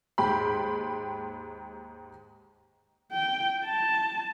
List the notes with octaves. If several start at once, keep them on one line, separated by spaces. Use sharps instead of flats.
D#2 G#2 G4 B5 C6
G5
A5